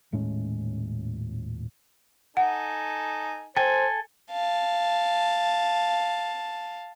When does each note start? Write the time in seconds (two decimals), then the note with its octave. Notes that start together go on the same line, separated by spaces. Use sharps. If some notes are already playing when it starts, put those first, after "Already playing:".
0.12 D#1 A2 G#3 C#4
2.37 D#4 A4 F#5 G#5
3.57 A4 C5 G5 G#5
4.31 F5 A5